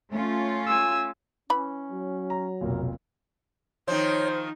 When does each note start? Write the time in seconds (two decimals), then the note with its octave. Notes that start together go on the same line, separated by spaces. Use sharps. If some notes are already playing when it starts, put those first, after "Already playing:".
0.11 A3 C#4 F4
0.67 G#5 E6
1.50 E3 C#4 B5
1.92 F#3
2.30 A#5
2.61 F1 B1 A#2 A#4
3.88 D#3 F3 D#4 C5 C#5